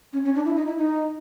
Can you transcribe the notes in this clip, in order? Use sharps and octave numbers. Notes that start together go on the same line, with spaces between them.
C#4
C#4
D4
E4
D#4
E4
D#4